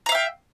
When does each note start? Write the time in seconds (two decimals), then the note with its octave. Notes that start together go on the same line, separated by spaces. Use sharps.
0.06 A#5
0.09 F5
0.12 E5
0.15 G5